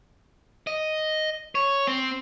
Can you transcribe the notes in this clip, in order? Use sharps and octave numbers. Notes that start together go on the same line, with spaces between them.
D#5
C#5
C4